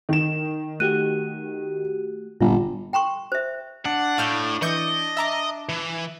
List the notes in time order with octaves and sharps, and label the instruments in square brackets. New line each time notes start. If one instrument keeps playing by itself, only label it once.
[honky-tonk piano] D#3 E7
[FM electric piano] A3 F#4 G4 [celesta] F#6 D#7
[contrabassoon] G1 [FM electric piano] A#2 [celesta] F4
[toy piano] G5 A#5 C6 C#6
C5 E5
[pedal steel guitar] D4 [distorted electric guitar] F#5
[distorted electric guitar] A2 [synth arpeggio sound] F5 F6 G6
[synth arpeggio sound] E3 C#6 G6 [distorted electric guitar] D#5
[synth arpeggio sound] E5 A#5 D6
[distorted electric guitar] E3